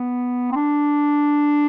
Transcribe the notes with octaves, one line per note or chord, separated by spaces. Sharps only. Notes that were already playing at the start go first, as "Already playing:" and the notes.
Already playing: B3
C4
D4